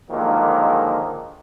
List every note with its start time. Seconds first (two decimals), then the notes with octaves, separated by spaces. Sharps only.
0.10 D3 D#3 F3 F#3 G#3 A#3